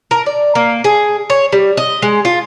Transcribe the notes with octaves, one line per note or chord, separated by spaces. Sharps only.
A#4
D5
A#3
G#4
C#5
G3
D#5
G#3
F4